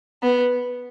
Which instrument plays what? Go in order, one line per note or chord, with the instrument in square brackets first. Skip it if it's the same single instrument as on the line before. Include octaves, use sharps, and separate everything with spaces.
[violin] B3